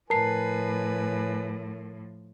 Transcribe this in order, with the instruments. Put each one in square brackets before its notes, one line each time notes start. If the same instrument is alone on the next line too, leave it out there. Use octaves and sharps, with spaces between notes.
[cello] A2 F3 [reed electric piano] A#4 [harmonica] B4 G#5 [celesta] A5 C7